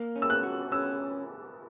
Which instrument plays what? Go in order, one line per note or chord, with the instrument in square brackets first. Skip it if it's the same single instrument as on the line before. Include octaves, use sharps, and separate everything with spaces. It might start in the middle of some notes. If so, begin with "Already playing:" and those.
Already playing: [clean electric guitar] A#3
C#4
[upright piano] E6
F#6
[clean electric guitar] F#4
[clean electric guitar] C#4 [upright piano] E6